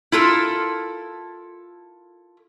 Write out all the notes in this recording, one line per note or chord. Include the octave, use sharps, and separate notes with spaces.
E4 F4 A4 A#4